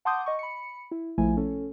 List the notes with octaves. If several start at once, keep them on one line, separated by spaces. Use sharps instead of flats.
F#5 A5 C6 D6 D#6 G6
D#5 C#6
B5 C#7
E4
A#1 F3 A3 E4 G#5
C#4 A4